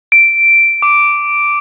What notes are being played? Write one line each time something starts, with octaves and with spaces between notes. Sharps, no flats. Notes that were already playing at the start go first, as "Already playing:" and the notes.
D7
D6